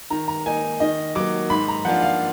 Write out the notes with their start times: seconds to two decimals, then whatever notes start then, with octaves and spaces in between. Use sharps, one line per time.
0.10 D#3 A#5
0.28 A#5
0.46 A#3 D#4 G#5
0.80 D#3 D#5
1.15 F#3 A#3 D6
1.50 G#2 B5
1.68 A#5
1.85 F3 A#3 D4 F4 F#5
2.02 F5